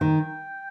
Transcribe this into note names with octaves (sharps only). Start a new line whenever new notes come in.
D#3 G5